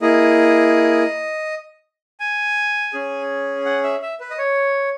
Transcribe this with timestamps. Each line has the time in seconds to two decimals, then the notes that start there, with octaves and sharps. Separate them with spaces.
0.01 A#3 E4 G#4 D#5
2.20 G#5
2.93 C#4 G#4
3.65 F#5
3.84 E5
4.02 E5
4.20 B4
4.30 D#5
4.38 C#5